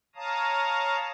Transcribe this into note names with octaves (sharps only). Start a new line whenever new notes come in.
C#5 F5 A5 A#5 D#6